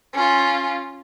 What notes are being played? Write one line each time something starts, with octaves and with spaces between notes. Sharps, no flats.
C#4 F4